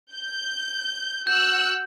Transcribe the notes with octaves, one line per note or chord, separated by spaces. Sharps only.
G6
F#4 E6 F#6 G6